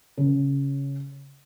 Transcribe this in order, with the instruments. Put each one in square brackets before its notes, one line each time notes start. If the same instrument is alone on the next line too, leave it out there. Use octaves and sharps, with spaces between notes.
[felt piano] C#3